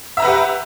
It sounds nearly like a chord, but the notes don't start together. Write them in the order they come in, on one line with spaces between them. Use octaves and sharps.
E5 A#5 B4 F#5 G4